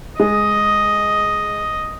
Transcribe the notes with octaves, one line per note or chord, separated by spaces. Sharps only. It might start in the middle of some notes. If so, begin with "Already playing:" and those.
G#3 D#5